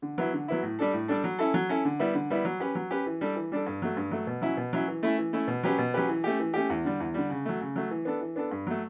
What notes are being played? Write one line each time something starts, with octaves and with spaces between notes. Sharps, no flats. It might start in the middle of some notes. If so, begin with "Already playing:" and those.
D3
F#3 B3 E4
D3
F#3 B3 E4
A2
G3 D4 A4
A2
G3 D4 A4
F#3
C#4 E4 A4
F#3
C#4 E4 A4
D3
G3 B3 E4
D3
G3 B3 E4
F#3
C#4 G4 B4
F#3
C#4 G4 B4
E3
G3 D4 A4
E3
G3 D4 A4
G2
F#3 A3
G2
F#3 A3
B2
F#3 C#4 E4
B2
F#3 C#4 E4
E3
A3 C#4 E4
E3
A3 C#4 E4
B2
F#3 C#4 G4 B4
B2
F#3 C#4 G4 B4
E3
A3 C#4 G4
E3
A3 C#4 G4
E2
D3 G3
E2
D3 G3
C#3
F#3 A3
C#3
F#3 A3
E3
B3 D4 A4
E3
B3 D4 A4
G2
F#3 A3